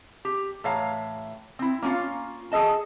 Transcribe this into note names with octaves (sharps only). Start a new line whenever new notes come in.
G4
A2 E3 C#5 F5 A#5
C4 E4
A#3 C#4 D#4 F4 F5
G#4 A4 D#5 A5